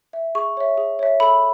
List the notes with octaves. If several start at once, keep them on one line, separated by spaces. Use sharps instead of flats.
E5
G#4 C#6
C#5 E5
G#4
C#5 E5
A4 B5